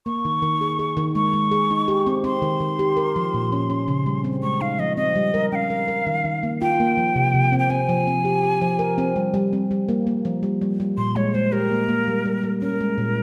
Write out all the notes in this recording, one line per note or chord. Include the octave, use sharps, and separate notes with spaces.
A#3 C#6
D#3
D#3
G#4
G#4
D#3
G#3 C#6
G#3
G#4
D#4
G4
C4
C4 C6
D#3
D#3
G4
A#4
F3
A#2
C#4
C#4
C#3
G3
C4
G#3 C#6
D#4 F5
F3 D#5
C4 D#5
G3
A#4
C#4 F5 G5
A#4
A#4
D#3
D#3
A#3
F4 G5
A#3
F3
C3
C3
C4
G5
C4 G#5
F3
C4
G4
G4
F3
A#4
C4
G3
G3
C4
G3
A#3
A#3
F3
G3
G3
G3
A#2 C6
G#3 C#5
G#3 C5
G4 A#4
A#3
A#3
G3
G3
G3
C#4 A#4
G#3
A#2